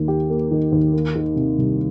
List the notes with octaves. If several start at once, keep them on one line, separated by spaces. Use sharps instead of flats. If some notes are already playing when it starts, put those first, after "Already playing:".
Already playing: D#2 D#3 A#3
G4
A#3
D#3
D#2
A#3
D#3
C3
C2